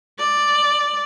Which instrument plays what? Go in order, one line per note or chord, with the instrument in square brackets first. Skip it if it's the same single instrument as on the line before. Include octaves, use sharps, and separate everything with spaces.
[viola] D5